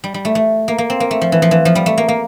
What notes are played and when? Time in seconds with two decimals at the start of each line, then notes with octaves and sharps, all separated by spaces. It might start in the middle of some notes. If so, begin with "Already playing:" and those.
0.04 G3
0.14 G3
0.25 A3
0.35 A3
0.68 A#3
0.78 A#3
0.90 C4
1.00 A#3
1.11 A3
1.21 F3
1.32 E3
1.42 F3
1.51 E3
1.65 F3
1.75 G3
1.86 A3
1.98 A#3
2.08 A#3